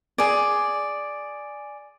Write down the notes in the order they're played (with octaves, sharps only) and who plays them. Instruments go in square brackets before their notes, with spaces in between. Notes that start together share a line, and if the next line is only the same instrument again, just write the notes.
[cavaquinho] G#4 D5